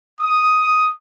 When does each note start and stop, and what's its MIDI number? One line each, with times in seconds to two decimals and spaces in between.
0.20 0.91 87